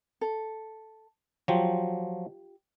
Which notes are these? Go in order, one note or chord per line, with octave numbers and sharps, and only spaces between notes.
A4
F3 F#3 F4 G4